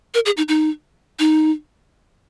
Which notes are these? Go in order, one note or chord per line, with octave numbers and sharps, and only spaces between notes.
A#4
G#4
D#4
D#4
D#4